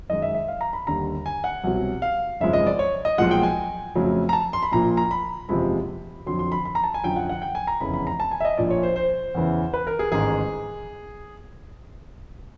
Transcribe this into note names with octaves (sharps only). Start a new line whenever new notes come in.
F#2 D#3 G#3 D#5
E5
E5
F5
A#5
B5
D#2 D3 G3 A#5
G#5
F#5
C2 B2 F#3
F5
G#1 F#2 C#3 F3 G#3 E5
D#5
D5
C#5
D#5
B1 A#2 F3 G#3 F#5
G5
G#5
F2 C#3 F#3 A3
A#5
A5
C6
B5
A#1 A#2 F3 A#5
A#5
B5
F#1 E2 C3 F3 G#3 B5
F2 D3 F#3 C6
C6
B5
B5
A#5
A5
G#5
F#2 D3 F3 G5
F#5
F#5
G5
G#5
A#5
F1 E2 C#3 E3 B5
B5
A#5
A5
G#5
E5
D#5
A#1 A#2 F3 D5
C#5
C5
C5
E2 C#3 E3
B4
A#4
G#4
A1 G#2 D#3 G#3 G#4